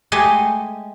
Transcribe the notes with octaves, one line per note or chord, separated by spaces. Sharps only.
G#3 A3 G4 D#5 G#5 C6